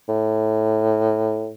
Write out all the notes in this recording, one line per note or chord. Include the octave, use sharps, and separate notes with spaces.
A2